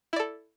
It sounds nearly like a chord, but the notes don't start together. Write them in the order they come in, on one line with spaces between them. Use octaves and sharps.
E4 D5 A4